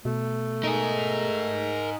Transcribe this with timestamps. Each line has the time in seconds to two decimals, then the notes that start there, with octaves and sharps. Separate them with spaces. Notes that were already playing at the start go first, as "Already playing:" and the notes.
0.05 B2 A3
0.64 D#4 G#4 A#4